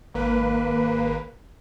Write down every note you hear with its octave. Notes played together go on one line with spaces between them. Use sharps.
G#1 A#3 B4